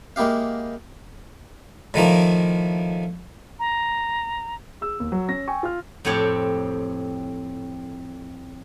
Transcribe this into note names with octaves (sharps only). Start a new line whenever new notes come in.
G#3 A#3 E4 G4 F5
A2 D#3 F3 A#3
A#5
G#4 E6
D#2
F#3
C#4 A#6
G5 G#5 C#6
F4 F6
F2 A2 C4 G4 C#5 A5